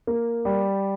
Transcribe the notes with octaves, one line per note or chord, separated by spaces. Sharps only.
A#3
G3